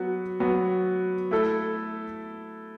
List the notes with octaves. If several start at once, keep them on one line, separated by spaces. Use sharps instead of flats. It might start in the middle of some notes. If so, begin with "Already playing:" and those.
Already playing: F#3 B3 F#4
F#3 B3 F#4
A3 E4 A4